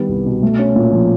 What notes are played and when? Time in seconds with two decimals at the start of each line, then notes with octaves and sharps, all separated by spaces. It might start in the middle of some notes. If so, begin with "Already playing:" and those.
Already playing: D#3 G3 B3
0.09 C2
0.26 B2
0.43 A3
0.59 C#4
0.76 A#2
0.92 F3